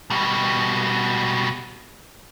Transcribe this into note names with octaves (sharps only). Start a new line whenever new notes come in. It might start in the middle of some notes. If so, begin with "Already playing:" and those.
B2 G3